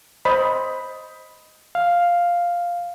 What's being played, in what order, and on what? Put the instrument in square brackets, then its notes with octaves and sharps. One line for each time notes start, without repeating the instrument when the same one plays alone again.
[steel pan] C5 D#5 B5
[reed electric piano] F5